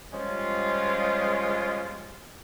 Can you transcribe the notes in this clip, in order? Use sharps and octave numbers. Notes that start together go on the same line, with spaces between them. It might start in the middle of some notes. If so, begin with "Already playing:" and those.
F3 G3 G#3 C#4 F4